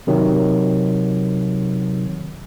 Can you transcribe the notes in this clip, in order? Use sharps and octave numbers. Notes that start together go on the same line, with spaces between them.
C3 D#3 F#3